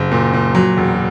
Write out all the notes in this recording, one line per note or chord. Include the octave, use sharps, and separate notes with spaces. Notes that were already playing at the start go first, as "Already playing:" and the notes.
Already playing: F#1
A#2
A#2
F#3
E1